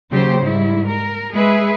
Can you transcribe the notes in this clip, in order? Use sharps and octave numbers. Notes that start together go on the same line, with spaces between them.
D#2 C#3 F#3 G4 C5
G#2 G3 E4
A#4
G#3 G#4 B4 E5